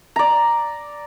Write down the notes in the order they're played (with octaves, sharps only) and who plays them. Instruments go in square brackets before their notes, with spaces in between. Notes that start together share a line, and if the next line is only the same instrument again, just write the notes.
[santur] D5 A#5